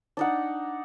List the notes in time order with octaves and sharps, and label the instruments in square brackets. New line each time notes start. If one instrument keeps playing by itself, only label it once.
[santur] D4 D#4 F#5